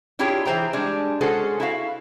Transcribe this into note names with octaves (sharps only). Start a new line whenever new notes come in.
D4 E4 F4 G4 G#4 C#5
E3 G#4 C5 G5 A#5
G3 G#3 D4
G#3 C#4 F#4 G#4 A4 C5
E4 F#4 F5